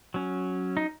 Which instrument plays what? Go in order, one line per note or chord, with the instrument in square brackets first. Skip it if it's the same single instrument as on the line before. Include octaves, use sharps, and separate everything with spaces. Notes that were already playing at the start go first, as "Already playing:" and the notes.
[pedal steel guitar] F#3 C#4
D#4